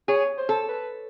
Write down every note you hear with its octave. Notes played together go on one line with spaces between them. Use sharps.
G#4 C#5
C5
A4
B4